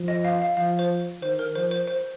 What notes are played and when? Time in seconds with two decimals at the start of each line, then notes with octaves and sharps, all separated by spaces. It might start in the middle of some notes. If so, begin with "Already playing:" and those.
Already playing: F3
0.08 D#5
0.25 F5
0.42 F5
0.57 F3 F5
0.79 C5
1.22 D#3 C5
1.39 A#4
1.55 F3 C5
1.71 C5
1.87 C5